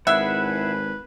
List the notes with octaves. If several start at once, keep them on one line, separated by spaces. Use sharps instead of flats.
G#1 E4 G#4 B4 E5 F#5